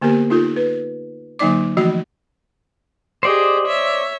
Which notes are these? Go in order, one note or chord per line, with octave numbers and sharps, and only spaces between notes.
D3 A#3 B3 G4 A#4
D#4 F4 A4
B4
D3 F#3 A#3 D#4 D5 D6
E3 F3 A3 F#4 D#5 B5
G4 G#4 C5 D5 D#5
C#5 E5